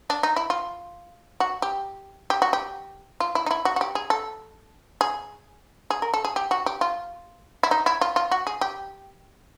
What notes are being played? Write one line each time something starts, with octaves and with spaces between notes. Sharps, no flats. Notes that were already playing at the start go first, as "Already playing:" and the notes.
D4
D#4
E4
F4
F#4
G4
G4
F#4
G4
F4
E4
D#4
E4
F#4
F#4
G4
G#4
A4
G#4
G#4
A#4
A4
G#4
G4
F#4
G4
F4
E4
D#4
E4
F4
F4
F#4
G#4
G4